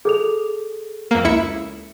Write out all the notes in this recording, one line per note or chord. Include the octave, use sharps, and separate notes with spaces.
G#4 A4 F7
F2 A#3
C#2 E4 C#7